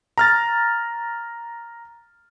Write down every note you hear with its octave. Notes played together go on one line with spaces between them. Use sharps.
A#5 F6 A6